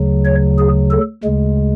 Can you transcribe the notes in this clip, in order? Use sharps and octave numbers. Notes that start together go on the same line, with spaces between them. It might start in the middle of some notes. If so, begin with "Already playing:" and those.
Already playing: D2 C#3 F#3
C#5
G#4
A4
D2 C#3 G#3